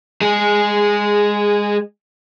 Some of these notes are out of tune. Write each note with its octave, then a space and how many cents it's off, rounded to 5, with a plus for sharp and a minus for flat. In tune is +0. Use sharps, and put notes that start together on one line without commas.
G#3 -15 G#4 +0